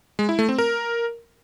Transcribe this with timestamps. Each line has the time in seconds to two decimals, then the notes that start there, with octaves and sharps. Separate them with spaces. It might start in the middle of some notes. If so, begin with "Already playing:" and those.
0.19 G#3
0.29 E4
0.39 A3
0.49 C4
0.58 A#4